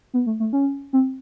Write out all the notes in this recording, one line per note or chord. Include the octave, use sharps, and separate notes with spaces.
B3
A3
A3
C#4
C4